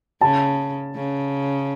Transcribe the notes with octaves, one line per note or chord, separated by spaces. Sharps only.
C#3 A5
C#3